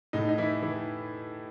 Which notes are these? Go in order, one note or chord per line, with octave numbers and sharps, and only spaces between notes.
A2 D#4
D#4
E3 E4
E3